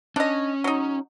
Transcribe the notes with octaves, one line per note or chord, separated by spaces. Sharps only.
C#4 D4 D#5
F#3 D#4